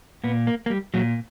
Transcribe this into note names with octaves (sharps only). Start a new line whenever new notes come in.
A#2 B3
A#3
A#3
G3
A#2 F#3